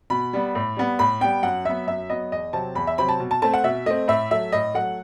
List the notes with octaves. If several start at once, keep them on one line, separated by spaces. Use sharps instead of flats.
B2 B5
G3 B3
A2
G3 B3
A2 B5
G3 B3 G5
F#2 F#5
F#3 B3 E5
F#2 E5
F#3 B3 D#5
E2 D#5
C3 F#3 C4 A5
E2 B5
E5
C3 F#3 C4 B5
A5
B2
A5
A3 C4 A5
F#5
B2 E5
A3 C4 D#5
A2 E5
F#3 A3 E5
A2 D#5
F#3 A3 F#5